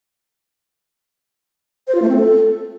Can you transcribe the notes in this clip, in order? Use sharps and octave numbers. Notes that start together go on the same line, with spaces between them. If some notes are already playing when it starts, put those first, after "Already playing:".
C5
F4
A3
C4
A4